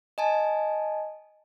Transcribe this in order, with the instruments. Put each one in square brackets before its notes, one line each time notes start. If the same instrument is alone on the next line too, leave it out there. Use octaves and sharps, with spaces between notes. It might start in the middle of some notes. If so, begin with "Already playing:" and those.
[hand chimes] D#5 G#5 A5